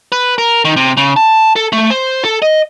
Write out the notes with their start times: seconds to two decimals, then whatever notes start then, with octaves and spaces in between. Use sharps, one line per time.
0.12 B4
0.38 A#4
0.65 D#3
0.77 C3
0.97 C#3
1.17 A5
1.56 A4
1.72 A3
1.90 C5
2.25 A4
2.42 D#5